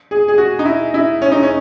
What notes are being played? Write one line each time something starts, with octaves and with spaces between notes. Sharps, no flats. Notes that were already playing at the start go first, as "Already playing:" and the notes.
G#4
G#4
F#4
D#4
E4
E4
C#4
D#4
C#4